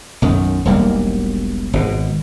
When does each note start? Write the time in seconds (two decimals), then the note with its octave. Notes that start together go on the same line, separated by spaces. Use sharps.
0.22 B1 F#2 D#3
0.65 E1 B1 G3 A#3
1.73 G#1 B2